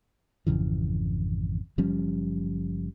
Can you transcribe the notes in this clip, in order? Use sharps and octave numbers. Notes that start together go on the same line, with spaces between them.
G#1 F2 C#3 E3
F#1 F3 G3 C#4